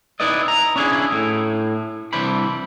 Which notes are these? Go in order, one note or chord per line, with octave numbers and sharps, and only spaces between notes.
D#4 E4 B4 D5 D#5
A#5
C#4 D4 E4 G4 G#4
A2
C2 E3 D4 C5 B5